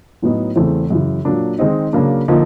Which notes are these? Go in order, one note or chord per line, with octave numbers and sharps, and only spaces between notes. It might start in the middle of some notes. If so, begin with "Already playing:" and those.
A2 F#3 B3 D#4
E2 C#3 E3 A3 C4
F#2 C#3 E3
A#2 F#3 A#3 D4
D#3 G#3 C4 D#4
C#3 F#3 A#3 D4
D3 F3 A#3 D#4